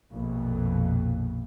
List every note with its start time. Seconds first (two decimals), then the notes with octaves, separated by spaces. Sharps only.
0.12 A#1 F2 B2